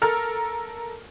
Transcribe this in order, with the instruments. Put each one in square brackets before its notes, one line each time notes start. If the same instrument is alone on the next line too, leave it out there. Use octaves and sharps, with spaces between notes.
[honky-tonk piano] A4 A#4 F6